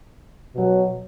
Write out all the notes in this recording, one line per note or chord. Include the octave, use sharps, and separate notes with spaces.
B2 F#3